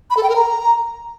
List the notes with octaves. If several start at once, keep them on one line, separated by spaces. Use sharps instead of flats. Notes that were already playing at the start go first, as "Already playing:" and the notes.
B5
A4
G5
A#4
A#5